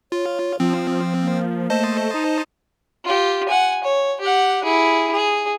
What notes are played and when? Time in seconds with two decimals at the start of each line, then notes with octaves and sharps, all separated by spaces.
0.12 F4 C#5
0.60 F3 C4 F4
1.21 A#3
1.70 A3 C5 D#5 A5
2.14 D#4
3.05 F4 G4
3.48 F#5 G#5
3.84 C#5
4.21 G4 F#5
4.64 E4 G#4
5.12 G#4